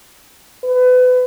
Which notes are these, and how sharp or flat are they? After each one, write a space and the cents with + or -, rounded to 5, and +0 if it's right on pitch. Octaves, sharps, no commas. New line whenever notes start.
B4 +30